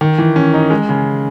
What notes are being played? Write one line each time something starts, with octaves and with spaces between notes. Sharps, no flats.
D#3
E3
C#4
D#4
G#3
C#3